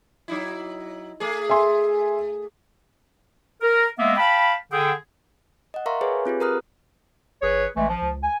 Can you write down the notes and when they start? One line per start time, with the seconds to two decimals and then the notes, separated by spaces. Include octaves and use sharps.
0.28 F#3 D#4 E4
1.20 A3 G#4
1.50 E5 G#5 C6
3.62 A#4
3.99 G#3 A#3 B3 E5
4.17 F5 G5 A5 B5
4.72 D3 G#4 G5
5.74 D#5 F#5
5.86 A#4 E5 F5 A#5 C6 C#6
6.01 G#4 B4 C#5 G#5
6.26 C4 F4 G4 G#4
6.40 A#4 B4 A#5 D#6 F6 F#6
7.42 G1 G#4 B4 C#5
7.76 A1 E3 G#3 A3
7.89 F3
8.01 C#2
8.23 G#5